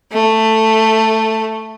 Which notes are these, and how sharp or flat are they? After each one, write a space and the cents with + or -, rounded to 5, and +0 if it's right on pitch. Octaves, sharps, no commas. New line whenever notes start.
A3 +10